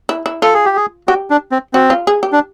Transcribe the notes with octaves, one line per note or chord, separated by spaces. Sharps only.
E4
E4
F4 A4
G#4
G4
G#4
F#4 G4
D4
C4
C4 F#4
F4
G#4
G4
D4